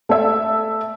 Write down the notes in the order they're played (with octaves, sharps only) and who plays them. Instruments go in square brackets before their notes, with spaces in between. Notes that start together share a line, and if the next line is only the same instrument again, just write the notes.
[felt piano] A3 E5